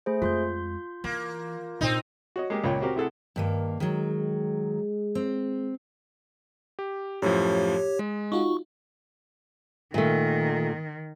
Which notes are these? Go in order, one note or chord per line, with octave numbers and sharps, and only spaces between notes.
A3 G#4 C5
F2 G#3 F4 C6 G6
E3 A#3
A#2 C4 D4 D#4
F#4 C#5 D#5
G#3 A#3 G4
C#2 A#2 C#5 G5
C4 F#4 G4 A#4
C3 E4 G#4 A4 F#5
G2 D#3 A#3
D#3 F#3 G#3
C4
G4
F#2 A2 F3 G4 C#5
G#3
D#4 F4 F#4 C#6
A#2 D#3 A3